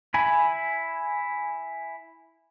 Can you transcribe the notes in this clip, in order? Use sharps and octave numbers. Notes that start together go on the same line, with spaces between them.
E4 G#5 B5